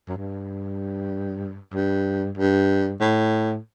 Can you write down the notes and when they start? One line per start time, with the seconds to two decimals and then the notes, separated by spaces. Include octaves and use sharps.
0.08 F#2
0.17 G2
1.74 G2
2.38 G2
3.01 A2